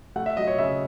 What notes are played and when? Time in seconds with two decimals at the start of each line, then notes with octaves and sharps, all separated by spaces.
0.16 A3 F#5
0.26 E5
0.37 F#3 D#5
0.47 C#5
0.58 C#3 E5